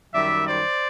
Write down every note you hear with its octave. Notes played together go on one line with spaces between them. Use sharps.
F#2 D#3 G3 D5 E5
C5 D5